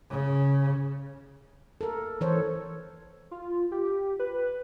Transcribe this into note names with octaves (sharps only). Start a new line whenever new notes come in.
C#3
A4 A#4
E3 A4 C5 C#5
F4
G4
B4